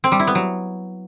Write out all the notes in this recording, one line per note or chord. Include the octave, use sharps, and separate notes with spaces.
C4
G3
E4
B3
F#3